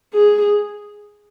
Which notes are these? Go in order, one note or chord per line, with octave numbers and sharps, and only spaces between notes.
G#4